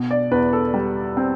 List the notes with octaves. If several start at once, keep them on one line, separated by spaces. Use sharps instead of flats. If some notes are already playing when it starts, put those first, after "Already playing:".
Already playing: B2
D5
E2 B4
A4
G3
C4